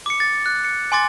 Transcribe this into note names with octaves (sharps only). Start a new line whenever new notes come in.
D6 C#7
A6
F#6
C#7
G#5 C6 D6 A6